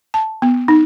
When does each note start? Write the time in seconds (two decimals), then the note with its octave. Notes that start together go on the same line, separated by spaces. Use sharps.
0.14 A5
0.42 B3
0.68 D#4